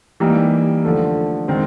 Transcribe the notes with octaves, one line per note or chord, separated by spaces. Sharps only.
E3 G3 A#3 D#4 G4
D3 F3 A3
D#3 G#3 C4